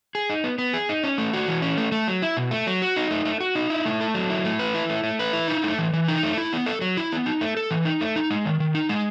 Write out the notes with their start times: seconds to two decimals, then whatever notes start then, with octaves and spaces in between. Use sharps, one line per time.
0.15 G#4
0.30 D#4
0.44 B3
0.59 B3
0.73 G#4
0.89 D#4
1.03 C#4
1.18 A3
1.33 F#4
1.48 E3
1.62 C#4
1.77 A3
1.92 A3
2.08 F#3
2.22 E4
2.37 B2
2.51 A3
2.67 F#3
2.82 F#4
2.96 D#4
3.10 A3
3.25 A3
3.40 F#4
3.55 D#4
3.70 E4
3.85 A3
4.01 A4
4.15 F#3
4.30 E4
4.45 A3
4.59 B4
4.74 E4
4.90 A3
5.03 A3
5.19 B4
5.33 E4
5.48 D#4
5.64 A3
5.79 E3
5.93 E3
6.08 D#4
6.23 A3
6.38 E4
6.53 B3
6.66 A4
6.81 F#3
6.97 E4
7.12 B3
7.26 D#4
7.41 A3
7.57 A4
7.71 E3
7.85 D#4
8.01 A3
8.16 D#4
8.30 G#3
8.45 D#3
8.60 D#3
8.75 D#4
8.89 G#3